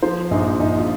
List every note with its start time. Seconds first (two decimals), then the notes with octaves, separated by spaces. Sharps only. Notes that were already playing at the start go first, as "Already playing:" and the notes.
0.02 F3 C5
0.31 A#1 D#4
0.60 A#1 D#4
0.78 F4